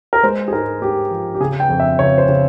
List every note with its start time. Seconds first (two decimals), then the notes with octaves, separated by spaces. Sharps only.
0.13 A#4
0.23 G#3 C5
0.48 G#4
0.53 G#2 A#4
0.82 G#3 G4
1.11 F3
1.35 G4
1.40 C#3 G#4
1.60 G5
1.69 F2
1.80 E5
1.99 C#3 C#5
2.18 C5
2.29 C#3